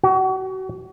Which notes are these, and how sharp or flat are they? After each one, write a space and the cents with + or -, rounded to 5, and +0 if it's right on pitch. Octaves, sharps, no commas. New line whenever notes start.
F#4 +35